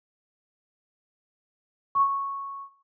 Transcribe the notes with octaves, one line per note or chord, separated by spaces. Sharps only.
C#6